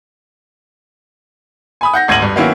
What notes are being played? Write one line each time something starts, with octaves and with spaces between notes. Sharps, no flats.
G#5 B5 D#6
F#5 G6 A#6
G#1 D2 G#6 A#6 D#7 F#7
G2
D#3 F#3 A#3 B3 C#4 E4